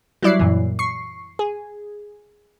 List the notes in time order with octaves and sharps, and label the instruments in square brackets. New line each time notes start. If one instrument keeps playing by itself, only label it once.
[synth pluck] F#3 G3 E4 D5 F#6 C7
F#2 A#2 E3
C#6 C7
G#4